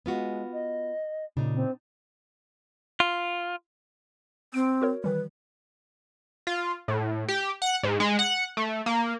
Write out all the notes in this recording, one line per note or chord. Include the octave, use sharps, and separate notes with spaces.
G#3 B3 F4 F#4
D#5
A#2 C#3 D4 D#4
C4
F4
C4 D7
F#4 A#4 C#5
D#3 E3 G3 B4
F4
A2
G4
F#5
G#2
G#3
F#5
A3
A#3